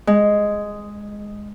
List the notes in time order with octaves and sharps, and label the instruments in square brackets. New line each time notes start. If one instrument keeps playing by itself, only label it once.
[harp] G#3